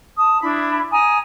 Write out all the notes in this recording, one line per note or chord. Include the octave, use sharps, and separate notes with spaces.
A5 D#6
D4 E4 B5
G#5 A#5 D#6